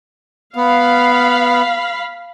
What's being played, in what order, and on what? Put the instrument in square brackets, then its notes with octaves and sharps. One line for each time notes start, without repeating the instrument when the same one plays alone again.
[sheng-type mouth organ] B3 [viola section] F5 B5